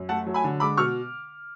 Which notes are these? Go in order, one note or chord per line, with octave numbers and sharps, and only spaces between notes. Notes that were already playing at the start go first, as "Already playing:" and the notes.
Already playing: F#2
A3 F#5 A5
F#3
G#5 B5
D3
G#3 B5 D6
B2 C#6 F6